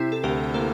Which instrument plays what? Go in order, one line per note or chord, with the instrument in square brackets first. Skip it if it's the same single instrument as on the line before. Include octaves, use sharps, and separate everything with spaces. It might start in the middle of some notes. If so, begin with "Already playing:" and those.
Already playing: [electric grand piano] C3 [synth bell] C4 E4
[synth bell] A4
[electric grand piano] D2 [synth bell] G4 A#4
[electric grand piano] A#3 [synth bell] A4 C5